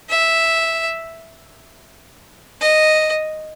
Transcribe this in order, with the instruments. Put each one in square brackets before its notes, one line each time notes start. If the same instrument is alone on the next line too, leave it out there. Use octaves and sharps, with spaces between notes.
[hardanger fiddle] E5
D#5